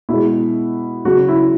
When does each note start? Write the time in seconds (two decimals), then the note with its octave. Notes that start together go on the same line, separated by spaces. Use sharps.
0.09 B2 G#3 E4
1.05 C#3 F#3 F#4
1.29 E4